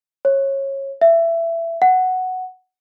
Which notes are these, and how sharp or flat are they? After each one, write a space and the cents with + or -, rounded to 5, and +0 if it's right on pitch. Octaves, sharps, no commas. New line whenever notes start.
C#5 -25
E5 +20
F#5 +5